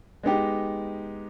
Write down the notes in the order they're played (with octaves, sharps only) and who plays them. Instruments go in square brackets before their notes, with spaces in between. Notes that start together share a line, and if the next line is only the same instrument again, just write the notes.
[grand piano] G#3 B3 D#4 G4